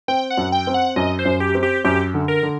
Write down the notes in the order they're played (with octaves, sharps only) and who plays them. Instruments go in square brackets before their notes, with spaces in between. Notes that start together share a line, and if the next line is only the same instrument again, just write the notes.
[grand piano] C4 [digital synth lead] G5
[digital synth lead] F#5
[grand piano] F#2
[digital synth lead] G5
[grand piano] C4
[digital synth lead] F#5
[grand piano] F#2 [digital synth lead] D#5
[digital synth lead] C5
[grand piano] F#2
[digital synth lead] G4
[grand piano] C4
[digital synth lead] G4
[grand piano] F#2 [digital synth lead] G4
[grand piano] D3
[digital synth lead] A#4
[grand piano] D3